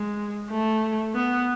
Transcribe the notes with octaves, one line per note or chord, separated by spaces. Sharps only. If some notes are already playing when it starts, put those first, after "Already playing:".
Already playing: G#3
A3
B3